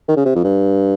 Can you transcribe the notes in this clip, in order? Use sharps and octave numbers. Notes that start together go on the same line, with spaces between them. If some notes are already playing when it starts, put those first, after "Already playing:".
D#3
C#3
C3
F2
G2